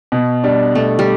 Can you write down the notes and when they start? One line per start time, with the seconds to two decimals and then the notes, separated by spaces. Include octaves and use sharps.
0.12 B2
0.44 G3 D4
0.75 B2 A3
0.99 G3